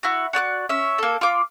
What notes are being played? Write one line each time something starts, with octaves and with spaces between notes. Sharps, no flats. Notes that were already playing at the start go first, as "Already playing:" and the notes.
E4 F#4
F#4 D5 E6 F#6
C#4 E5
A#3 A4
F4 D6